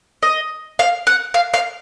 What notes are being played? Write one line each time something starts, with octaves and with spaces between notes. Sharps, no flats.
D#5
F5
F#5
F5
F5